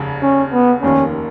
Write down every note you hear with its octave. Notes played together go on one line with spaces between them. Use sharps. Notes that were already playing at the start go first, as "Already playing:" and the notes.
Already playing: F1 D#2 C#3
C#4
B3
F1 D#2 D#3 A#3 C#4